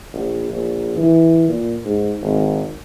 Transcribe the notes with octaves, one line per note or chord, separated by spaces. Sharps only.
A#1
A#1
E3
A#2
G#2
G#1